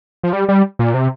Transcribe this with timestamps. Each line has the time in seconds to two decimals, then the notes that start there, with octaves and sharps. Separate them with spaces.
0.23 F3
0.33 G3
0.49 G3
0.79 A#2
0.94 C3